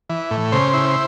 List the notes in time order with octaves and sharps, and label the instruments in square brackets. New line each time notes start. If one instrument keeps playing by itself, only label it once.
[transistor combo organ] E3
A2
C#3 C5
E4